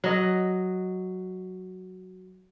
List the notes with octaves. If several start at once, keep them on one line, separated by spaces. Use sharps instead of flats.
F#3 D#5